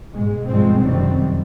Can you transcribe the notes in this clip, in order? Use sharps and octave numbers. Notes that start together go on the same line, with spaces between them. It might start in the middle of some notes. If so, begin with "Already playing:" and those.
G#2 B2 G#3
G2 B2 F3 G3 G#3 C4
F1 F#2 D#3 F#3 G3 C4